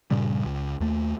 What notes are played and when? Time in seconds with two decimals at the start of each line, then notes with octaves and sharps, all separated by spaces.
0.11 G2 A#2 C#3 G3
0.45 C#2
0.80 D#2 A3